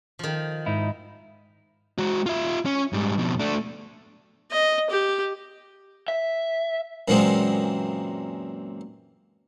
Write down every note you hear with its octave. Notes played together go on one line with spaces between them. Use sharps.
D#3 F3
G#2 D#4 E4
G#3 F#4
F4 E5
C#4
G#2 G3
F2 B2
A3 D4
D#5
G4
E5
F#2 A#2 E3 F#3 G#3 C4